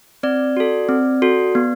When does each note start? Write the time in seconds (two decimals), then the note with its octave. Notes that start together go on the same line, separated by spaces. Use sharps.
0.23 C4 D5
0.57 F#4 A4
0.89 C4
1.22 F#4 A4
1.55 B3